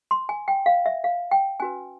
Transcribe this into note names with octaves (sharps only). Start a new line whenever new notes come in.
C6
G#5
G5
F5
E5
F5
G5
C#4 F#4 B4 G#5